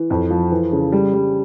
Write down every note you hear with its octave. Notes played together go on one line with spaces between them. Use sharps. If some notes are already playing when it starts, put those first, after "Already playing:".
Already playing: E3
F2
F3
E3
C#3
G3
G3